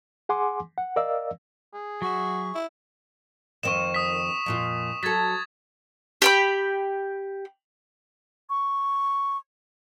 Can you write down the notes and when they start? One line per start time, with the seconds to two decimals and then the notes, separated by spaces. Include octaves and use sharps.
0.29 G#4 F#5 G#5 C6 D6
0.78 F#5
0.96 A#4 D5 D#5 F5 E6
1.74 G#4
2.02 F#3 F#4 E5 C#6
2.55 E4
3.63 F2 D#3 C4 C#6 E7
3.94 D#6 B6
4.46 F2 A#2 F4
5.03 F#3 A4 G#6 A6 B6
6.22 G4 G5 B5
8.50 C#6